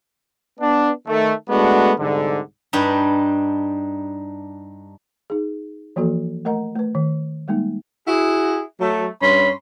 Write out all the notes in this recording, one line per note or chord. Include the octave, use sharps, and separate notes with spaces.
B3 D4
D#3 A3
G#3 A3 B3 D4 F#4
C2 G#2 D3
G2 G3 D4 D#4
D#4 G#4
E3 F3 A#3 F#4 A4
A3 A#4 D#5 F#5 A#5
A3 B4
D#3
G3 G#3 A#3 D#4
E4 F#4 G#4
F#3 A3
G2 C#4 B5 C6